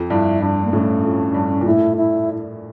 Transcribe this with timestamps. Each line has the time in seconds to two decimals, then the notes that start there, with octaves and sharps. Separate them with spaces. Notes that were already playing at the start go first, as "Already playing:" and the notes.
Already playing: F2
0.10 G2 E4
0.42 G2 D4
0.64 A#3
0.73 A2 C#4
1.03 F2
1.34 G2
1.61 A#2
1.66 A2 E4
1.97 E4